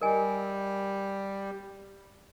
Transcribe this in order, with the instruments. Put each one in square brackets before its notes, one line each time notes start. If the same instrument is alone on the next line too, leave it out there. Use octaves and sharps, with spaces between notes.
[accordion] G3 [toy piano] A#4 D#5 G#5